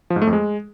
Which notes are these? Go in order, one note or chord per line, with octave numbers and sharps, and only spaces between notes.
F3
G#2
A3
F2
G#3